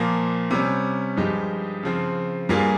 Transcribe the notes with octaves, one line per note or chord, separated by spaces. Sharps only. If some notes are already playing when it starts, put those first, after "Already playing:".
Already playing: A#2 F3 A#3
C3 G3 C#4
G2 F3 G#3 D#4 G4
C#3 F3 C4
G2 G3 A#3 F4 G#4